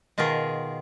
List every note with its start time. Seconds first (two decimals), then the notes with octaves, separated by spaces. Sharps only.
0.18 B2 D#3 F4 G#4 A#4